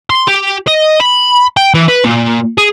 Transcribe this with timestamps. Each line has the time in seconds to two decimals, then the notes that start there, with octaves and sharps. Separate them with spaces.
0.10 C6
0.27 G4
0.67 D#5
1.00 B5
1.57 G5
1.74 E3
1.88 B4
2.04 A#2
2.58 G#4